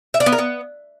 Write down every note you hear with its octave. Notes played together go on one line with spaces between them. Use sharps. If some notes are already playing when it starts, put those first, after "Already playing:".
E5
D4
B3
A#4
B3